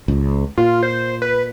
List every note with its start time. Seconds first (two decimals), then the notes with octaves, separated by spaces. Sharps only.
0.08 C#2
0.58 A#2 F4
0.83 C5
1.22 B4